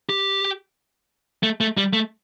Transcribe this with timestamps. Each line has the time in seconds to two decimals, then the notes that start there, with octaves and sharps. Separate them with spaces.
0.09 G4
1.43 A3
1.61 A3
1.77 G3
1.93 A3